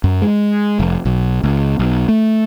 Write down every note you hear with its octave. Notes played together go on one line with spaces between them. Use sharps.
F#2
G#3
F1
B1
C#2
B1
A3